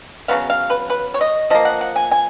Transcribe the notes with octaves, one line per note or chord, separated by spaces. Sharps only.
C#3 F#3 B3 F5
F5
B4
B4
C#5
D#5
F3 A#3 D#5
F#5
F#5
G#5
G#5